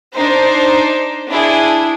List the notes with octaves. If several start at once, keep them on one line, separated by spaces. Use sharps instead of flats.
D4 D#4 C5
D4 E4 G#4